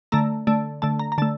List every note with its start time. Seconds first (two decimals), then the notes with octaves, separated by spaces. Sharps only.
0.12 D3 A3 A#5
0.47 D3 A3
0.82 D3 A3 A5
0.99 A#5
1.12 A#5
1.18 D3 A3 A5